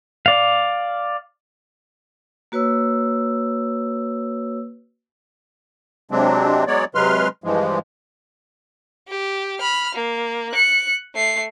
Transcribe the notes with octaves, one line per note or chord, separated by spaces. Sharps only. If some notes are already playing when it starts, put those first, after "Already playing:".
D5 F5
A#3 F#4 B4 C#5 E6
C3 F#3 G#3 C4 D4
F#3 G#3 B3 C#5 D5
C3 F#3 G#3 B4 C6 F6
G2 E3 F3 G#3
G4
B5 F6
A#3
F#6 C#7
A3 C7